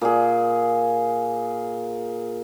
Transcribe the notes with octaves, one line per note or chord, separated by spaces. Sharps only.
A#2 G#4